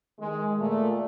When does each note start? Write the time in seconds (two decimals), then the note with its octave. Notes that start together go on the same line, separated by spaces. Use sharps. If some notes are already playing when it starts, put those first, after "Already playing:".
0.20 D#3 G#3
0.59 A#2 A3